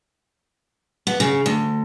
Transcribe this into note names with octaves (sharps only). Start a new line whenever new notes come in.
B3
C#3
D2